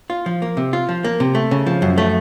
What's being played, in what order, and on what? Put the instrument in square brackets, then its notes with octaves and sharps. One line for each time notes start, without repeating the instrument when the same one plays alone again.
[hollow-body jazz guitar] F4
F3
A#3
C3
F4
F3
A#3
C3
A3
C#3
F3
F#2
A3